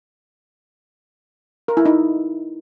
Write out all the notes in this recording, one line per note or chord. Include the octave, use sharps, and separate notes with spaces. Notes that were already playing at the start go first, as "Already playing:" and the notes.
A#4
E4
D#4